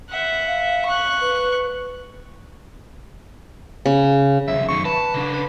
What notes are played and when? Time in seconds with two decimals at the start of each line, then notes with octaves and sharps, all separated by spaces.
0.10 E5 F#5
0.47 F5
0.85 C#6 F#6
1.21 B4
3.86 C#3
4.48 C2 F2 E5
4.69 F#2 D#3 C#6
4.85 B4 A5
5.14 C#3 D4
5.34 B4